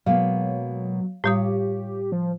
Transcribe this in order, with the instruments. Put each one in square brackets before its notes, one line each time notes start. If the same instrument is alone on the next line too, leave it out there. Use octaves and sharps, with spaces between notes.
[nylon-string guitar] B2 G#3 A#3 [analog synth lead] F#3 [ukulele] F5
[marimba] A2 G3 D#6 [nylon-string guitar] F4 C#5 [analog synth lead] G4
[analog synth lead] F3